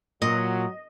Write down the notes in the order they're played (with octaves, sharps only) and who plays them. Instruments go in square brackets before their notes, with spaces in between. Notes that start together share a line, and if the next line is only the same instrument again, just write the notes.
[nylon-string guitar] A#2 [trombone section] F#3 [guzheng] D#5